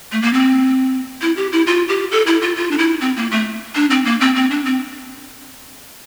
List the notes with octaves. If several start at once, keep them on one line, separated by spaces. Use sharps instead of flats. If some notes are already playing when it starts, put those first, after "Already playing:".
A3
A#3
C4
E4
G4
E4
F4
G4
A4
E4
F4
F4
D4
E4
C4
A#3
A3
D4
C4
A#3
C4
C4
D4
C4